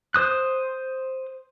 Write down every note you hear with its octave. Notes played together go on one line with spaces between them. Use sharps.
C5 D#6 F#6